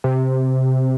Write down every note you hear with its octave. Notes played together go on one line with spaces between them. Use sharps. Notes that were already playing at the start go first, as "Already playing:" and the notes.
C3